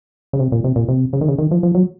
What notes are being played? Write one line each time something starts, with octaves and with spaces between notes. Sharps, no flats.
C#3
C3
A#2
C3
A#2
C3
C#3
D#3
C#3
D#3
F3
F3
F#3